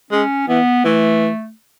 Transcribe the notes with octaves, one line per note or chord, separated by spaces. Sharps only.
G#3 C#4
E3 B3
E3 A3